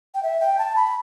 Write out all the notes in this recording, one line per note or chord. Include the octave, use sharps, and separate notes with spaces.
G5
E5
G5
A5
B5